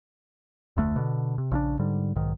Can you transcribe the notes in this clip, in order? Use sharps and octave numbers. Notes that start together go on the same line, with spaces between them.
F1 D2 A3
B2 D3
C3
A#1 C#3 C#4 D4
G#2 D3 G3
B1 G#2 D#3